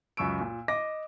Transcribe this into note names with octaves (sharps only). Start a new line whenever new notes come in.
C#2 F#2 C#6 E6 D7
A#2
D#5 D6 A#6